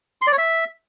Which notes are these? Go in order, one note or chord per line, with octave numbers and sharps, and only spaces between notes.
C6
D5
C#5
E5